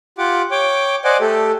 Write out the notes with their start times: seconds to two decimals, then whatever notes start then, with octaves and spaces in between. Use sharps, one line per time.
0.18 F4 G4 F#5 D6
0.51 C#5 G5 D6
1.04 C5 D5 D#5 F#5 G#5 D6
1.20 A3 G4 A4